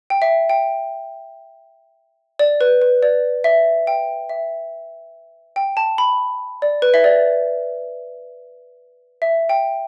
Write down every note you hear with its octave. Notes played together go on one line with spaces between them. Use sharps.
G5
E5
G5
D5
B4
B4
D5
E5
G5
E5
G5
A5
B5
D5
B4
E5
D5
E5
G5